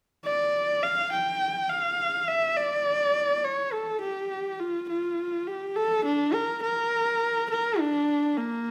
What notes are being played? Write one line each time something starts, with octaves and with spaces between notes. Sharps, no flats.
D5
F5
G5
F5
E5
D5
C#5
A4
G4
F4
F4
G4
A4
D4
A#4
A#4
A#4
D4
A#3